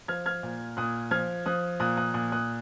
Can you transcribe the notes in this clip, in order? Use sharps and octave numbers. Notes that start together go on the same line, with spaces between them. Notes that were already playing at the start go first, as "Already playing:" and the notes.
F3 F6 G#6
F6 G#6
A#2
A#2 D#6 F#6
F3 F6 G#6
F3 D#6 F#6
A#2 D#6 F#6
D#6 F#6
A#2 D#6 F#6
D#6 F#6